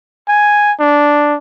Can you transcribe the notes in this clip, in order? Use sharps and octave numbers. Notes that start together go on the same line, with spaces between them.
G#5
D4